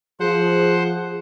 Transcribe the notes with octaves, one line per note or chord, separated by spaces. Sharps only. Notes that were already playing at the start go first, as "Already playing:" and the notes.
F3 G#4 C5 F#5